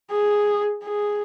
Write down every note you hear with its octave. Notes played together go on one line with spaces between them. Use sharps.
G#4
G#4